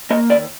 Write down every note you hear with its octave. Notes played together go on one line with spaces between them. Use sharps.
A#3 D#5
D#2 D5